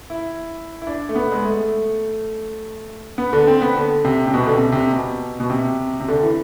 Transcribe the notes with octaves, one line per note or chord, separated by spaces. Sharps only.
E4
E4
D4
A3
B3
G#3
A3
B3
D3
C4
B3
D3
C3
C3
B2
D3
C3
C3
B2
B2
C3
C3
D3
E3